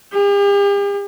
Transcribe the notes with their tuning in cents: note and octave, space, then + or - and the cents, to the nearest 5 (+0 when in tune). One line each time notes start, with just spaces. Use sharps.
G4 +45